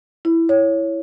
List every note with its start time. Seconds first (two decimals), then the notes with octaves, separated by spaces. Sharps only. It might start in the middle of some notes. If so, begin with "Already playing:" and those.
0.25 E4
0.49 C#5